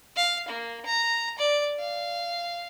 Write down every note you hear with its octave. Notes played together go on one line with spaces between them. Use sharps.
F5
A#3
A#5
D5
F5